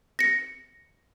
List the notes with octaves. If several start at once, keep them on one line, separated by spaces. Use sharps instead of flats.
A#6 C#7